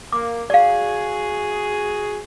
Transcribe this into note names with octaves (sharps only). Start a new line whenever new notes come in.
A#3 D6
F#4 G#4 D5 F5